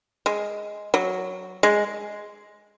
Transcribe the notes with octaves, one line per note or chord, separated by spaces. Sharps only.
G#3
F#3
G#3